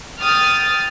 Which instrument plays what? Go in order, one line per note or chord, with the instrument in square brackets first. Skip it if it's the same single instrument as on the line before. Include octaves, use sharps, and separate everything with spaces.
[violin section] G5 D#6 F6 A6